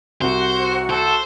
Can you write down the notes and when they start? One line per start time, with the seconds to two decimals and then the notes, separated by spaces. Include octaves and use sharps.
0.21 C2 F#4 C5
0.90 A4 C5